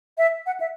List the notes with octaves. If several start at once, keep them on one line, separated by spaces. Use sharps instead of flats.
E5
F#5
E5